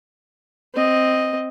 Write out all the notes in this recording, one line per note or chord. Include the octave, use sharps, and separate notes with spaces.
C4 D#5